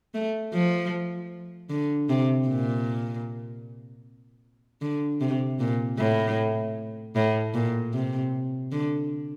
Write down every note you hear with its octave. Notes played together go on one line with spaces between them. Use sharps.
A3
F3
D3
C3
A#2
D3
C3
A#2
A2
A2
A#2
C3
D3